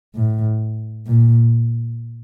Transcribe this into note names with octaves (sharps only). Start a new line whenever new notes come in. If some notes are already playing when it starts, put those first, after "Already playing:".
A2
A#2